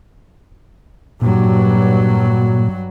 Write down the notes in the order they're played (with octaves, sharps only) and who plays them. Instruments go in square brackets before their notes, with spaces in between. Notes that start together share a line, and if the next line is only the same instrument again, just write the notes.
[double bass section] G2 F#3 [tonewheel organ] A#2